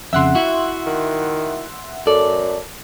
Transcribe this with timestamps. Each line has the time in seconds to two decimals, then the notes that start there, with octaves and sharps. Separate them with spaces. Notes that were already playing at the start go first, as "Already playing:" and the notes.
0.13 F2 C#3 E5 F#5 C6
0.35 E4 F#4
0.87 D#3
2.07 F#2 A4 D5